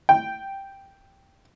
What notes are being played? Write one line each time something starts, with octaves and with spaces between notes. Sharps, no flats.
G5